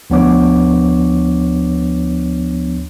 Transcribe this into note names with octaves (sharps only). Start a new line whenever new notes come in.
D2 F3 B3 D4 C#5 D6